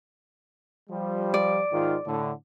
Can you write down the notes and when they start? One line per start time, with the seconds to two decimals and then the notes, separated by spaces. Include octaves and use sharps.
0.89 F3 G3
1.34 D5
1.72 G#2 D#3 F4
2.06 A2 D3